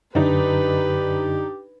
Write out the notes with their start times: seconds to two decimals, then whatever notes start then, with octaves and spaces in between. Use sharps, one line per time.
0.15 F#2 D3 D4 D#4 G4 B4